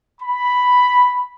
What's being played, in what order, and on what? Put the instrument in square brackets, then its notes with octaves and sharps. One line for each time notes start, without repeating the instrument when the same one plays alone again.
[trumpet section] B5